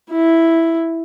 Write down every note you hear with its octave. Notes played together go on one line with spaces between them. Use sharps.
E4